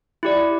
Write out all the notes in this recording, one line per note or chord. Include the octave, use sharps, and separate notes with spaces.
E4 G4 D5